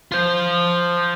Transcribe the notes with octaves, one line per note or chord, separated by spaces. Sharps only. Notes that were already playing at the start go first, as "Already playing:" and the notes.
F4 C5